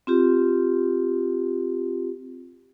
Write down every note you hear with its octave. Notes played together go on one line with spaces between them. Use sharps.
C4 F4 G4